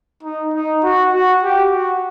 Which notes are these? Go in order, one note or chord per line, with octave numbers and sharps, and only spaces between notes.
D#4
D#4
F#4
F#4
G4
F#4